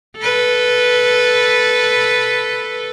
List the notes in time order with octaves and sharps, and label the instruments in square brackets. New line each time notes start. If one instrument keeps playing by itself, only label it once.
[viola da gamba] A4 B4